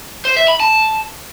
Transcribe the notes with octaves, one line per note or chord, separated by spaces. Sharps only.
C5
E5
B5
A5